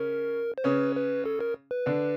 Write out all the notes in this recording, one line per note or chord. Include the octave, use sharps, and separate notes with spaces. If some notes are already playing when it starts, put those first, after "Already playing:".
Already playing: C#3 C#4 A#4
C5
C#3 C#4 B4
B4
A4
A#4
B4
D3 D4